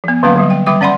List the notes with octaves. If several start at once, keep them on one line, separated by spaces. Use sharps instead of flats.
F3 B3
D3 F#3 A#3 C#4 B4 F5
D3 F#3 G3
G5
D#3 G3 E5 G5 D6
C#4 D5 F#5 B5 C6